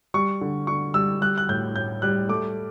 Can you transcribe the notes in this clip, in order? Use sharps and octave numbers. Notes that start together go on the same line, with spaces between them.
G3 C#6
D3
D3 C#6
G3 E6
G3 F#6
F#6
A2 G6
A2 G6
G3 F#6
A3 D6